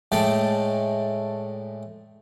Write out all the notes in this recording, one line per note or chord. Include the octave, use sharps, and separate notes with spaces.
A2 G#3 A3 D5 G5 A5